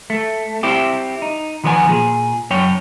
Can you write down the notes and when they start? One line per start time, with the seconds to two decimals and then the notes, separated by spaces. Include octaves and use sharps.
0.10 A3
0.63 C4 E4 G4
1.22 D#4
1.64 D#3 F3 B3 C#5 G#5
1.88 A#2 G#4
2.51 F#2 C#5 G5